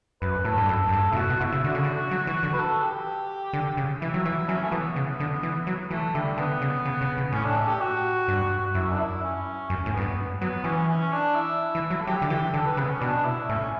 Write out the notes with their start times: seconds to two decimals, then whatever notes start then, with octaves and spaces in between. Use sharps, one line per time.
0.22 F#2 B4
0.45 A2 A4
0.58 G2
0.69 F#2 A4
0.88 F#2
0.93 G2
1.12 B2 E4
1.17 A2 F#4
1.29 B2
1.41 B2 E4
1.53 C#3
1.64 D3 F#4
1.75 C#3
1.84 D3
2.11 F#3
2.27 E3
2.43 D3
2.53 B4
2.59 A4
2.83 G4
3.53 D3
3.77 C#3
4.01 E3 E4
4.14 F#3
4.25 E3 E4
4.48 F#3 C#4
4.64 A3
4.72 E3 B3
4.96 C#3
5.20 D3
5.43 E3
5.67 F#3
5.91 E3 A3
6.14 D3 G3
6.38 D3 B3
6.61 C#3
6.86 C#3
7.01 C#3
7.17 C#3
7.32 A2 C#4
7.44 D4
7.57 A4
7.68 G4
7.81 F#4
8.28 G2
8.74 F#2 E4
8.92 D4
8.99 E4
9.23 C#4
9.70 F#2 C#4
9.86 A2
9.94 F#2 B3
10.01 G2
10.40 F#3 B3
10.64 E3 C#4
10.88 C#4
11.12 D4
11.35 E4
11.75 E3
11.90 F#3
12.01 A4
12.07 F#3 G4
12.22 D3
12.30 E3 G4
12.54 D3 A4
12.66 B4
12.77 C#3 B3
12.90 C#4
13.01 B2 D4
13.25 E4
13.49 A2 C#4